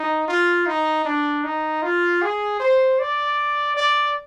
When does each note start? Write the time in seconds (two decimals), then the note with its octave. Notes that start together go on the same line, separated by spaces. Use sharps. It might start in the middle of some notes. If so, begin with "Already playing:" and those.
Already playing: D#4
0.28 F4
0.67 D#4
1.05 D4
1.44 D#4
1.83 F4
2.22 G#4
2.60 C5
2.99 D5
3.77 D5